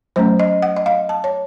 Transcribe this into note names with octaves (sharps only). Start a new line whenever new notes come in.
F#3 A3 C#4 C5
D#5
F#5
D#5
F5
A5
C#5